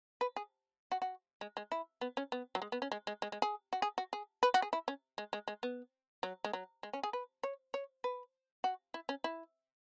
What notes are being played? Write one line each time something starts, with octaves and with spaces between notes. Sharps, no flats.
B4
G#4
F#4
F#4
G#3
G#3
E4
B3
C#4
B3
F#3
G#3
B3
C#4
G#3
G#3
G#3
G#3
G#4
F#4
G#4
F#4
G#4
B4
F#4
G#4
E4
C#4
G#3
G#3
G#3
B3
F#3
G#3
F#3
G#3
C#4
G#4
B4
C#5
C#5
B4
F#4
E4
C#4
E4